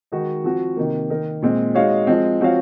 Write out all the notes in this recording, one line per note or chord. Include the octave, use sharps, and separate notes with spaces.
D#3 G#3 D#4 F#4
F3 C4 F#4
C3 D#3 A#3
D#3 A#3 D#4 A#4
A#2 G#3 C4
G#3 D#4 F#4 C#5 F5
F3 G#3 C4
F3 C4 F#4 C#5 F5